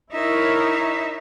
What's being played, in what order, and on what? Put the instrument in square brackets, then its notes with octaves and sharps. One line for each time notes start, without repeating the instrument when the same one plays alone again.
[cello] D#4 E5 [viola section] E4 A#4 C#5